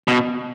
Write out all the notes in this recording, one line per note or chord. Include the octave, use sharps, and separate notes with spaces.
B2